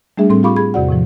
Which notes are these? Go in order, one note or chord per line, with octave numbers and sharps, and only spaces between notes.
G3 A3 D4 G#4 E5
A2 G3 C4 A4 C6
F4 G4 F5 B5 C#6 D6
G#4 B5 G#6
E2 C3 F#4 D5 F#5
A2 C3 F3